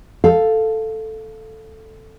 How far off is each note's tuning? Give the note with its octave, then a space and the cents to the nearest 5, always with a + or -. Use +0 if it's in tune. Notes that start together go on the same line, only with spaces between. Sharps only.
A4 +0 F5 +0